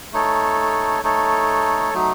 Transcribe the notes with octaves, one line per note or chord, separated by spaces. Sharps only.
A3 D#4 A4 C#5
A3 D#4 A4 C#5
F#3 A3 D#4